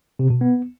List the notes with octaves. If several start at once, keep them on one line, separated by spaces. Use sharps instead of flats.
C3
B2
B3